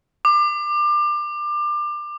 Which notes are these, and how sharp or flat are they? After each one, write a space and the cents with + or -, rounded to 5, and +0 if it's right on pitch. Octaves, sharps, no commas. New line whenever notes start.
D6 +25